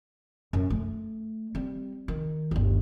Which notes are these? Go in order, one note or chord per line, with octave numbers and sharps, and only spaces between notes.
F#2
A3
G3 C4
D#3
G1 D#2